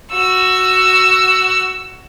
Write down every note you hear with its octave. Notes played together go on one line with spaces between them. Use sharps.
F#4 E6